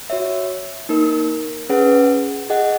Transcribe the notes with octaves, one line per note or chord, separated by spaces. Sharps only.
F#4 C#5 E5
A#3 D#4 A#4
C#4 G#4 B4 F#5
G#4 D#5 F#5